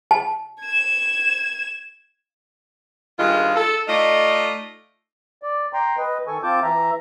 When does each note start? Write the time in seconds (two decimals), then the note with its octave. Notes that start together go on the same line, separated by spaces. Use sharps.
0.11 A5
0.61 G#6 E7
3.18 G2 D#3 G#3 F4
3.56 A4
3.87 A3 D#4 F4 D5 D#5
5.43 D5
5.73 G5 A#5 C6
5.98 B4 D#5
6.27 D#3 A4 G#5 C#6
6.43 C4 F4 A5 D6 G6
6.63 E3 E5 A#5